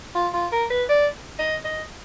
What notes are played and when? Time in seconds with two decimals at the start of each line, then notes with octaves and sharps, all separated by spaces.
0.15 F4
0.33 F4
0.52 A#4
0.70 B4
0.89 D5
1.39 D#5
1.64 D#5